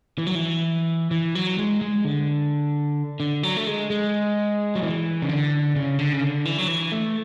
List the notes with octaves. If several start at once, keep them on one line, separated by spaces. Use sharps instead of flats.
E3
F#3
E3
E3
F#3
G#3
G#3
D3
D3
F#3
A3
G#3
G#3
F#3
E3
C#3
D3
C#3
D3
C#3
D3
E3
F#3
E3
A3